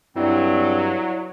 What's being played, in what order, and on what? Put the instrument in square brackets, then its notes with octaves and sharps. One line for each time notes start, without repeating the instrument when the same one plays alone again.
[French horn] G2 [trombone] F#3 [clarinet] C4 [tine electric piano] E4 D5